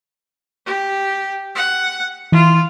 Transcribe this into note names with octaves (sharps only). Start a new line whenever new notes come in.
G4
F#5
E3 F4